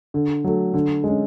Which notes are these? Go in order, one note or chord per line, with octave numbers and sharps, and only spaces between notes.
D3
F#3 A3
D3
G#3 C#4